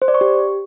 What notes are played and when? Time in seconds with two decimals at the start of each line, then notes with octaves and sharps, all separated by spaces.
0.02 C5
0.08 D5
0.15 C#6
0.21 G4